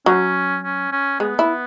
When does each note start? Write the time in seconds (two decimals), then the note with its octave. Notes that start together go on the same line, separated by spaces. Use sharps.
0.06 F#3 C#4
0.63 C#4
0.92 C#4
1.20 G#3 B3
1.39 E4